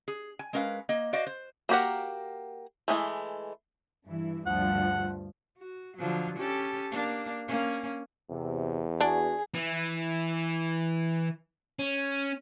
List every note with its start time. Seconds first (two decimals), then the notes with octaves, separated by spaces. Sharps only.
0.08 G#4
0.39 G#5
0.53 G#3 C#4 A#4 B4 F5
0.89 A#3 D#5
1.13 F#4 C5 D5 D#5 F5
1.27 C5
1.69 A#3 F#4 G4 A#4 F#5
2.88 E3 G#3 A3
4.05 G2 E3 E4
4.46 D2 G2 F3 F#5
5.58 F#4
5.97 D3 F3 F#3
6.37 C#4 G4 A4
6.91 A#3 D4
7.48 A#3 C#4
8.29 E2 C3
9.01 B3 D4 F#4 G#4
9.54 E3
11.79 C#4